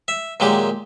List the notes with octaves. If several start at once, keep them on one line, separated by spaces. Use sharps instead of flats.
E5
A#2 D#3 F#3 G#3 G4